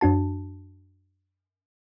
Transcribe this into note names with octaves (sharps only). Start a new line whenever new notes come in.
F#2 D4 F#4 A5